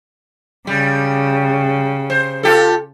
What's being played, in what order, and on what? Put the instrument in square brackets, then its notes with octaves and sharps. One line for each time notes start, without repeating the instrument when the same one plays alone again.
[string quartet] C#3 [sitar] G3
[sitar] C5
F4 G4 A4